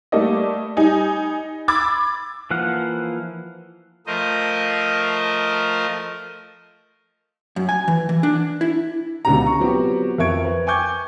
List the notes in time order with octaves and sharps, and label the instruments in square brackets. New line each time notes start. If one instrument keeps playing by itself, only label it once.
[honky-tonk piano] G3 A3 A#3 D5 D#5
G3 D#4 G#5
B5 C6 D6 E6 G#6 A6
[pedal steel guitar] E3 F3 A#3 F5 F#5
[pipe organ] F3 A3 A#4 C5 D#5
[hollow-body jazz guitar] F#2
G#5
E3
E3
D4
E4
[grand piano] C#2 B2 D3 C#4 G4 A#5
A#5 C#6
F3 F#3 B3 C4 F#4 G4
F2 A#4 E5 C#6 G#6 D7
B4
G5 G#5 C#6 D6 G6 G#6